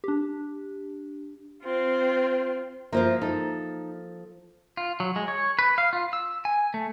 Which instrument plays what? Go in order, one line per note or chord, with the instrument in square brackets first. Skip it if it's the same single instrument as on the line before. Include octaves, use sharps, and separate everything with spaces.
[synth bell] D4 G4
[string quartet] C4 F4
[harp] F3 A#3 A#4 [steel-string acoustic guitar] F4 C5 E5
[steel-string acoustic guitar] D#4 [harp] A4
[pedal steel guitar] F4
F#3
G#3
C#5
B4
F5
F4
E6
G#5
A3